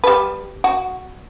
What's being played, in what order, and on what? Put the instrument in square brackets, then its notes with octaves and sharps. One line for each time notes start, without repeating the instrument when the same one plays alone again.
[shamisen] G3 B4
F#4